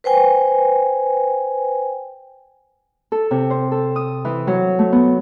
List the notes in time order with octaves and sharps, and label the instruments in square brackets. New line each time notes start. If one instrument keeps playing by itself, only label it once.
[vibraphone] B4 C5 G5 G#5
[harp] A4
C3
C5
A4
D#6
E3
F#3
A3
B3